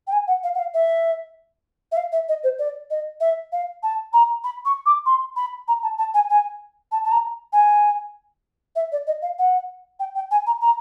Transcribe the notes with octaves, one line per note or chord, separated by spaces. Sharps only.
G5
G#5
F#5
F5
F#5
F5
E5
E5
F5
E5
D#5
C5
D5
D#5
E5
F5
A5
A#5
B5
C#6
D6
C6
B5
A#5
A5
A5
G#5
G#5
A5
A5
A#5
G#5
E5
D5
D#5
F5
F#5
G5
G5
G#5
A#5
A#5